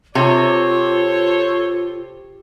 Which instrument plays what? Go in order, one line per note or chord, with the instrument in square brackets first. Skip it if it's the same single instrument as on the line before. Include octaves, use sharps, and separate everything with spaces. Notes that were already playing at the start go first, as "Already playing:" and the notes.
[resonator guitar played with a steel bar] C3 [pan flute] F4 [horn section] A4 C5 C#5